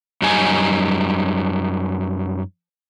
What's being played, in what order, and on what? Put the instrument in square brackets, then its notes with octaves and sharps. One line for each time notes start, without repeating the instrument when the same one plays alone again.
[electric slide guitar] F#2 G3 D#4 G#5